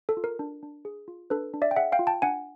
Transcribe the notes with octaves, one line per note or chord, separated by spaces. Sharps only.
A4
F4
A#4
D4
D4
G#4
F4
D4 A4 B4
D4
D5 E5
G5
G#4 E5 F#5
F5 G5
F4
G5 A5
D4 F#5 G#5